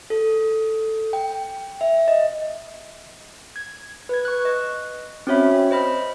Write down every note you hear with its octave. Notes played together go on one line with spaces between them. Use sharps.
A4
G5
E5
D#5
G#6
B4 G#6
C#6 F#6
D#5
C4 C#4 F#4 C#5 E5 B5
C5 D#5 B5 F6